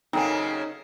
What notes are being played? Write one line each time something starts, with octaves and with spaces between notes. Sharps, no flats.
F#2 C#3 A#3 C4 D#4 A4 G#5